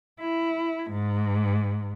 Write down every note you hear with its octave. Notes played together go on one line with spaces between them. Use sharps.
E4
G#2